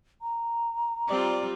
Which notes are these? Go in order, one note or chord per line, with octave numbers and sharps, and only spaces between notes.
A#5
G3 C4 F4 D5